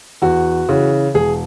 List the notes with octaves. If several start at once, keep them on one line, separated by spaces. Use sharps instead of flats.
E2 F#4
C#3 E3
E1 G#4